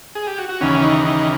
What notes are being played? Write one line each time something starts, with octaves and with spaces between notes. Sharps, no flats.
G#4
G4
F#4
F#4
D#2 C#3 E3 C#4
D#4
D#4